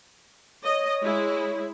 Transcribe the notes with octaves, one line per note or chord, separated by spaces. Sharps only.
C#5 D#5
G#3 E4